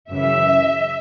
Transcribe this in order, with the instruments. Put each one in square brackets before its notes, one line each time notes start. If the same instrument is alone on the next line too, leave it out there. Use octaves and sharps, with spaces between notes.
[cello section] F#2 C#3 E3 E5